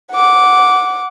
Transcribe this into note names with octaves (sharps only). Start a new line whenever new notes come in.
F#5 D6